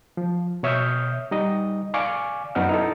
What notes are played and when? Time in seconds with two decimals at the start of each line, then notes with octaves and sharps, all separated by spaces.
0.17 F3
0.63 B2 C#5 E5 D#6 F6 G6
1.31 G3 D#4 D#5
1.94 D5 F5 G#5 C#6 D6
2.55 F#2 B3 D#4 D5 F#5 F6
2.69 D#4 E4 A4